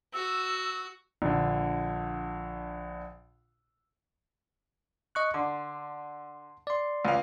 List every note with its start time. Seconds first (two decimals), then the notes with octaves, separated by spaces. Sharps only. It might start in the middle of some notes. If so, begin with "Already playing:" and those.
0.14 F#4 E6
1.22 A#1 D3
5.15 D#5 C#6 F#6
5.34 D3 C6
6.67 D5 C6
7.05 C#2 F5